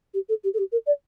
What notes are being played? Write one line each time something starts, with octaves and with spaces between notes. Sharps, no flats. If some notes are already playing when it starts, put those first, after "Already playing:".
G4
A4
G4
A4
G4
A#4
D5